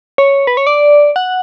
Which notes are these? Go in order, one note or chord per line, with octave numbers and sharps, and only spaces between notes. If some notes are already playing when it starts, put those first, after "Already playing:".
C#5
B4
C#5
D5
F#5